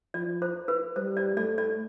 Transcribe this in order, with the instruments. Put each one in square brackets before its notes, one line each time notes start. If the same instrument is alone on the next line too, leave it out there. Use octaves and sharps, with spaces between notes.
[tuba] F3 [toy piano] D5
[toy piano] C5
B4
[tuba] G3 [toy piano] C5
[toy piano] D5
[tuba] A3 [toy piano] D5
[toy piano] D5